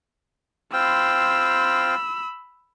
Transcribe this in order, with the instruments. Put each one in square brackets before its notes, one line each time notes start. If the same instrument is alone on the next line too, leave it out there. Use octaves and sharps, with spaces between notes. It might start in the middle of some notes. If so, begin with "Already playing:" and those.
[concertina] C4 F4 G5 [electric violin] B5 E6